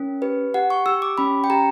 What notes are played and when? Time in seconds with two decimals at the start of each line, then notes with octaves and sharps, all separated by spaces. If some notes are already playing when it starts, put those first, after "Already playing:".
Already playing: C#4 A#4
0.22 G4 B4
0.54 G4 F#5
0.70 C#6
0.86 G4 E6
1.02 D6
1.18 C#4 B5
1.44 G5
1.50 G4 A#5